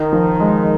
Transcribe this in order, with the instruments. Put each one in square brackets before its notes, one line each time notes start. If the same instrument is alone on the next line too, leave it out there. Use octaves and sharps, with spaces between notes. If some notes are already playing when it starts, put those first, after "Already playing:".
Already playing: [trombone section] D#3 [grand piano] D#4
[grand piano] F3
G#3